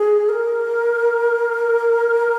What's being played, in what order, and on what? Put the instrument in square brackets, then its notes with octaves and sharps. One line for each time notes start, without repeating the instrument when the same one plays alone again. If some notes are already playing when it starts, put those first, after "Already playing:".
Already playing: [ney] G#4
A#4